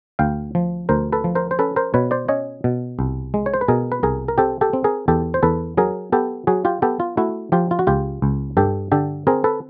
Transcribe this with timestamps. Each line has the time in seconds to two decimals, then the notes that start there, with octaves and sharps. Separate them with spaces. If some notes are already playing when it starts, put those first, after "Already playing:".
0.19 D2 F5 G5
0.55 F3
0.89 D2 A#4 C5
1.12 A4 B4
1.24 F3
1.35 A#4 C5
1.51 C5
1.59 C#4 A4 B4
1.76 A#4 C5
1.94 B2 B4 C#5
2.11 C5 D5
2.28 C#4 C#5 D#5
2.64 B2
2.99 C2
3.34 G#3
3.46 C#5
3.54 C5
3.61 B4
3.68 B2 G#4 A#4
3.92 B4
4.03 C2 G#4 A#4
4.28 A#4
4.38 C4 G4 A4
4.61 G4 A4
4.73 C4
4.84 G#4 A#4
5.08 E2 G4 A4
5.34 C5
5.43 E2 A4 B4
5.77 F#3 G#4 A#4
6.12 B3 G4 A4
6.47 F#3 F#4 G#4
6.65 F4 G4
6.82 B3 G4 A4
7.00 F4
7.17 A3 E4 F#4
7.52 F3 F4 G4
7.71 F4
7.79 F#4
7.87 C#2 F4 G4
8.22 C#2
8.57 G2 G4 A4
8.92 D3 G4 A4
9.27 C4 G#4 A#4
9.44 A4 B4